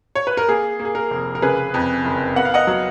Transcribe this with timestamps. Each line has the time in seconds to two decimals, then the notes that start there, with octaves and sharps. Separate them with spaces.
0.15 C#5
0.27 B4
0.37 A#4
0.48 A#3 G#4
0.80 A#3
0.85 G#4
0.95 A#4
1.11 F1
1.35 A#4
1.42 C#3 G#4 B4
1.74 F2
2.05 F#1
2.36 B3 F#5
2.45 F5
2.54 D#5 F#5
2.67 F#3